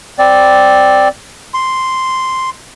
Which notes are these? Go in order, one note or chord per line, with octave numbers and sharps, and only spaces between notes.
C4 D5
C6